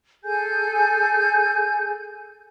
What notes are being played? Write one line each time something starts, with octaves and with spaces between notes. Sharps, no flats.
G#4 A4 G#5 G6